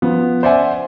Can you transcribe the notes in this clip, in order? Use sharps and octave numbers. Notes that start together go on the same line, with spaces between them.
F3 B3
C5 D5 E5 F#5 G#5